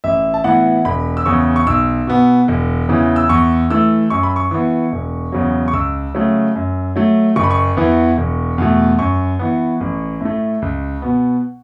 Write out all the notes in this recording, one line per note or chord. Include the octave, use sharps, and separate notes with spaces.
A1 E5
A5
A2 E3 B3 F#5
E1 B5
E6
E2 C#3 C#6
C#6
B1 E6
B2 B3
E1
E2 C#3 E3
E6
E2 C#6
E3 A3 E6
F#2 C#6
B5
C#6
E3 B3
E1
E2 C#3 F#3
C#6
C#2 E6
C#3 F#3 A3
F#2
F#3 A3
F#1 C#6
B5
C#6
E2 E3 B3
E1
E2 B2 A3
F#2 C#6
E3 B3
A1
A2 A3
C#2
B2 B3